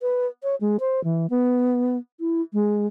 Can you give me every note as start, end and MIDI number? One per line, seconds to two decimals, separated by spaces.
0.02 0.27 71
0.43 0.55 73
0.61 0.77 56
0.80 1.03 72
1.04 1.26 52
1.30 1.97 59
2.20 2.41 64
2.53 2.86 56